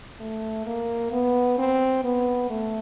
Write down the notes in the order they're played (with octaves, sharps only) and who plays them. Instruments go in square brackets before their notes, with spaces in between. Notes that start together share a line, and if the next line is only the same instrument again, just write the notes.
[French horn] A3
A#3
B3
C4
B3
A3